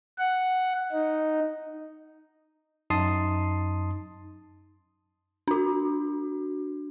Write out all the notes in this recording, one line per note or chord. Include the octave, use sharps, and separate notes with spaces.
F#5
D#4
F#2 D#4 A5 C6 D#6 C7
D4 F#4